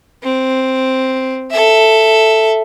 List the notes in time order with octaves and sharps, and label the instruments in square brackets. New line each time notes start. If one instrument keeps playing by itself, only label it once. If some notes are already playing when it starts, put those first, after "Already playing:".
[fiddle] C4
A4 E5